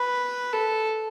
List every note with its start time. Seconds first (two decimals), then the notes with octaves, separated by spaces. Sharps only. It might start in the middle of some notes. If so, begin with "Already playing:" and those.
Already playing: B4
0.53 A4